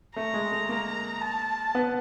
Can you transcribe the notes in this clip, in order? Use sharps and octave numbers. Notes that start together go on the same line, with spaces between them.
A3 A#5
G#3
A3
A#3
A5
B3